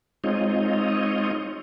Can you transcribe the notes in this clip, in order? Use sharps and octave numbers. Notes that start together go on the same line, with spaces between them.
G#3 C4 D#4 F4 C#5 D#5